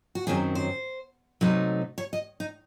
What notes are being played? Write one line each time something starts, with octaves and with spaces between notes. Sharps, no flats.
F#4
F#2 D#3 F#3 C4 G#4
C5
C3 F#3 A3 D#4
C#5
D#5
D#4